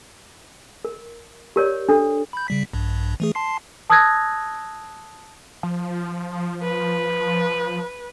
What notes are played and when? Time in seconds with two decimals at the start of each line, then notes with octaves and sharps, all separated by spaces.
0.85 A#4
1.56 G4 A#4 C#5 D5
1.89 D4 A4
2.33 B5 G6
2.48 C#3 G3 B6
2.73 A#1 G2
3.20 E3 A3 G#4
3.35 A5 C6 C7
3.90 A5 D#6 E6 F#6 G#6 A#6
5.63 F3
6.63 B4